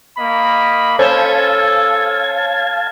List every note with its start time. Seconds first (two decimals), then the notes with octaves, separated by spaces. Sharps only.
0.18 A#3 D#5 B5
0.99 C#4 A4 C5 C#5 F5 A5 G#6